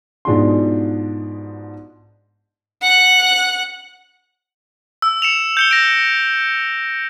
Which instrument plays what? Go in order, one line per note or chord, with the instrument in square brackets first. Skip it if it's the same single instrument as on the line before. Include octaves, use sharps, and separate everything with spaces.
[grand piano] G#2 B2 D4 F4 G#4 C6
[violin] F#5 F#6
[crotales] E6
C#7 E7 F7
G6 C#7 G7
A#6 D7